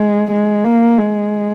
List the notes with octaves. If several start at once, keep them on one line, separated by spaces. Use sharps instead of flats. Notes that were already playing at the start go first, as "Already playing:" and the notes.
Already playing: G#3
G#3
A#3
G#3